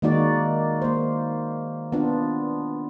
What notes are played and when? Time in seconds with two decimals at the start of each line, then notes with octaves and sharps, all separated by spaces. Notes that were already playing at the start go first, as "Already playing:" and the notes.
0.02 D#3 G#3 A#3 D#4 F#4 D5
0.82 A#3 C5
1.92 B3 D4 F4